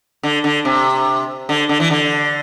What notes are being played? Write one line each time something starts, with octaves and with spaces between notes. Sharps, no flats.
D3
D3
C3
D3
D3
E3
D3